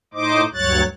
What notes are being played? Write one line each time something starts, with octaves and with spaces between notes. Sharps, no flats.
A2 D#4 C5 D#5 D6
D2 G2 F#3 C#5 F#6 A6